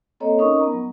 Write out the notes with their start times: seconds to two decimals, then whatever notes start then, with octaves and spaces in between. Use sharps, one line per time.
0.20 A#3 C4 A4 C#5 D#5 A#5
0.39 C#4 D#4 A#4 D#5 C#6 D#6
0.60 B3 A#5
0.72 F#3